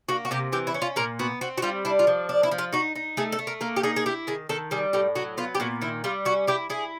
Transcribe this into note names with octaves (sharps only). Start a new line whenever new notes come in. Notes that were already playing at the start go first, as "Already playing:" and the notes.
A#3 F#4
F#4
C3 G4
E3 G4
E4
C#4
F4
A#2 A#4
B3 F#4
C4 F#4
F#4
G3 F4
D4 E4
F4
F3
D4
E4
F3
F4
D#4 F#4
D#4
A3 G#4
A4
A3
A#4
A#3 A#4
G4
D#4 G#4
G#4
E4 G4
D#3 G#4
D#3 A4
G3 G#4
A2 G4
F#3 F#4
B3 F4
G4
A#2 F#4
D#3 E4
G3 F4
C#4 F#4
E4 G4
E4 G#4